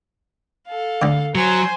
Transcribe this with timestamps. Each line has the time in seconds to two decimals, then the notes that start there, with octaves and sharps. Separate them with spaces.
0.68 A4 F5
1.02 D2 D3
1.35 F#3 C5 G#5